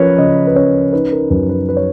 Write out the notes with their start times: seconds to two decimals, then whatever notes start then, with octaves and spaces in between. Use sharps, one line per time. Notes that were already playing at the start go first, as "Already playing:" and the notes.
Already playing: F3 C#4 A#4 B4 C#5
0.18 C#3 D#5
0.47 B4
0.55 C#4 C#5
0.93 D#4 B4
1.12 A#4
1.30 F#2 B4
1.49 B4
1.69 B4
1.77 C#5